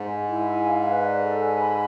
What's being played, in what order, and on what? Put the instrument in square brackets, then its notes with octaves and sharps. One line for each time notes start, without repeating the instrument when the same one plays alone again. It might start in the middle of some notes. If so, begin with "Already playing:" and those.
Already playing: [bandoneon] G#2
[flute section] G#5
E4
G#5
F5
B4
D5
A4
G#5
B5